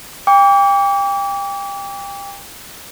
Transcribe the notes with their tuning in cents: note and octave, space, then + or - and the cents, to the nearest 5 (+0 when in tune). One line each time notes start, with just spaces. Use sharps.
G5 +30 D6 -35